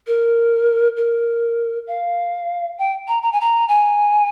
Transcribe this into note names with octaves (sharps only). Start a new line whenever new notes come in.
A#4
A#4
F5
G5
A#5
A#5
G#5
A#5
G#5